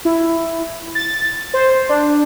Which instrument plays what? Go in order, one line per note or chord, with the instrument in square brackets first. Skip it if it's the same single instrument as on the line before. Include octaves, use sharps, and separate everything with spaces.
[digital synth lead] E4
A6
C5
D4